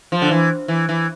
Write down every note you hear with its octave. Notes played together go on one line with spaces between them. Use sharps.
F3
D3
E3
E3
E3